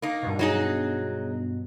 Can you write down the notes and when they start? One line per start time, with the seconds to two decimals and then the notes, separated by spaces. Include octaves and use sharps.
0.02 A#3 D#4
0.23 G2 B2
0.39 F#3 D#4 G#4